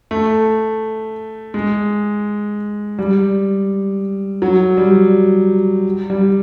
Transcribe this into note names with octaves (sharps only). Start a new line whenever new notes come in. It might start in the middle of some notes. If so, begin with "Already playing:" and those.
A3
G#3
G3
F#3
G3
G3